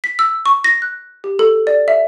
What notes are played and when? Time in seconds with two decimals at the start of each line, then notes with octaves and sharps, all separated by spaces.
0.04 B6
0.19 E6
0.46 C#6
0.64 A#6
0.82 F#6
1.24 G4
1.39 A4
1.67 D5
1.88 E5